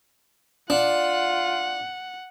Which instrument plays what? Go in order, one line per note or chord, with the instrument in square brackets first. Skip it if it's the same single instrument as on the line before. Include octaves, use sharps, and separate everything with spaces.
[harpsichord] D4 [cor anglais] F4 [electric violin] F#5